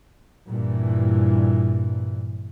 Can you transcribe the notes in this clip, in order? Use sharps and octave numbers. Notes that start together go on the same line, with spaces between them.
G2 A#2 E3